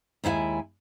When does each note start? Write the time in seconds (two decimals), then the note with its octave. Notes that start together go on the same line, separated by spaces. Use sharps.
0.24 D#2 G#3 E4 F#5 G#5